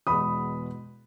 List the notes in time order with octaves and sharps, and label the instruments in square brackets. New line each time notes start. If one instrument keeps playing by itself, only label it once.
[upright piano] E2 B2 G#3 B5 D#6